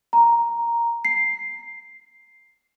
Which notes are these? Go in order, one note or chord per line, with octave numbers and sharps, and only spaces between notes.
A#5
C7